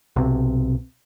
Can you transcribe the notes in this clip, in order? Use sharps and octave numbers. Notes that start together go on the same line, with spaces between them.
B1 C3